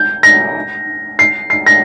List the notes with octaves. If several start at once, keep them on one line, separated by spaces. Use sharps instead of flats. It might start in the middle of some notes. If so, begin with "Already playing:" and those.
Already playing: G6
A#6
C7
C7
A#6